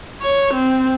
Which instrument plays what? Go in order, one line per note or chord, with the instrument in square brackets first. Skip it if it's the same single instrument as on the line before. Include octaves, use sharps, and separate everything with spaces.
[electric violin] C#5
C4